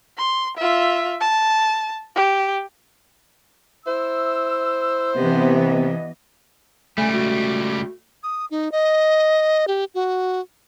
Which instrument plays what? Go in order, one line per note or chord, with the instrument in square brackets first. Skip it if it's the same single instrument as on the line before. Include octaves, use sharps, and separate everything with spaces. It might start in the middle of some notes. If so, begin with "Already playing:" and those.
[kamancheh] C6
F4 E5
A5
G4
[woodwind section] E4 E6 [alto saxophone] C5
[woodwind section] G2 D#5 [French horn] C3 [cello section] E3 B3
[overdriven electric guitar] C#2 G3 [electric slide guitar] A3 [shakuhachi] G#5
[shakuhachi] F#4
[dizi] D#6
D#4
D#5
G4
F#4